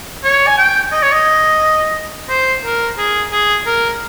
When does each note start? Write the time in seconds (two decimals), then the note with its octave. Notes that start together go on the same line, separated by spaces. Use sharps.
0.24 C#5
0.47 G#5
0.58 G5
0.92 D#5
1.02 C#5
1.12 D#5
2.29 C5
2.64 A#4
2.98 G#4
3.32 G#4
3.66 A#4